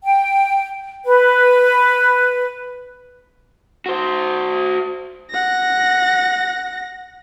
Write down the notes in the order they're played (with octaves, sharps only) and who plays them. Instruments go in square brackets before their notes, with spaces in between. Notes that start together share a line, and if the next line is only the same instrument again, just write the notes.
[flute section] G5
B4
[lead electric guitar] F#4 C5
[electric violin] F#5 A#6